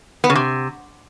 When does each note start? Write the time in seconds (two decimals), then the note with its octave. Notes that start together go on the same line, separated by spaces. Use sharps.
0.24 B3
0.30 C#3
0.35 C3